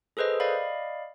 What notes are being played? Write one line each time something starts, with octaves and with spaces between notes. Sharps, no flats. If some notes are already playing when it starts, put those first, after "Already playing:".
G#4 A4 B4 C5 D#5
D5 D#5 F5 B5